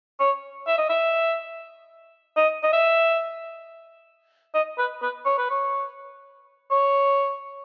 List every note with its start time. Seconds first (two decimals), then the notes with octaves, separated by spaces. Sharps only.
0.20 C#5
0.67 E5
0.78 D#5
0.89 E5
2.37 D#5
2.63 D#5
2.73 E5
4.54 D#5
4.78 B4
5.02 B4
5.26 C#5
5.38 B4
5.50 C#5
6.71 C#5